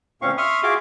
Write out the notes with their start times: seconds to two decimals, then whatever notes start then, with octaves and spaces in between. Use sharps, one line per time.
0.22 D2 A#2 C4 C#4 F5 C#6
0.38 E5 C6 C#6 D#6 F6
0.63 F4 F#4 G#4 E5 C6 D6